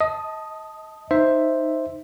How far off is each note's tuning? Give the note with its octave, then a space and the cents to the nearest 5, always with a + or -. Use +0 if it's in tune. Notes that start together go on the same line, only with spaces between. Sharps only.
D#5 +25 A5 +0 D#6 -5
D#4 +0 C5 +0 E5 +0